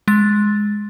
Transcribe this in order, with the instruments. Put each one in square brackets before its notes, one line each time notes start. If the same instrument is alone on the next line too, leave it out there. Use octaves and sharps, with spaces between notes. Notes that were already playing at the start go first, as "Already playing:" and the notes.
[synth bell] G#3 A6